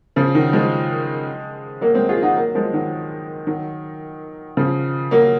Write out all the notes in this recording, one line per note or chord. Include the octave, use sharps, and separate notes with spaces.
C#3 F3
D#3 F#3
F3 G#3
F#3 A#3
G#3 C4
F4 G#4
D#4 F#4
F#3 A#3
F3 G#3
D#3 F#3
D#3 F#3
C#3 F3
F#3 A#3